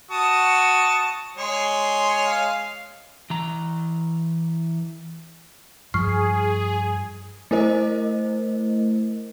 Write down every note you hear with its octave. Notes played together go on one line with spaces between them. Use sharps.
F#4 A5 C#6 D#6
G#3 C#5 C6
F5
E3 A#5
G2 F3 G#4 C#6 F6 C7
A3 E4 A#4 C5 D#5